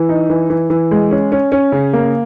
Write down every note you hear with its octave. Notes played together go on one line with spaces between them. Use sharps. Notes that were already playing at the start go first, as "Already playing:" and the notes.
Already playing: E3
D#4
E3
E3
E3
G#3
C#4
C#4
C#4
C#3
A#3